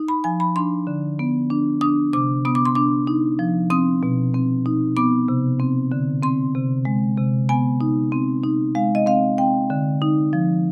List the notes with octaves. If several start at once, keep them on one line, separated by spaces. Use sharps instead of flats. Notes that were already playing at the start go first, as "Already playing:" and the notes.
Already playing: D#4
B5
F3 G#5
B5
D4 C6
D3
B3
D4
D4 D#6
C3 D6
B3 D#6
D6
C6
D4 D6
D#4
F3
C4 D#6
B2
C4
D#4
B3 D6
C3
C4
D3
C4 C6
C3
G#3
C3
B3 G#5
D#4
C4
D#4
G#3 F5
D#5
C4 F5
C4 G5
D3
D#4
F3